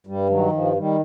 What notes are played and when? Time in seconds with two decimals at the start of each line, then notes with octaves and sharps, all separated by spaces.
0.07 G2 G3
0.29 D#3 F#3
0.52 G2 F3
0.76 D#3 G3